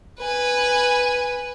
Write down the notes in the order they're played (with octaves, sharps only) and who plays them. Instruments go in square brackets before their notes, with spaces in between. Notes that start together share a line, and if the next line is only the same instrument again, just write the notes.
[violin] B4 G#5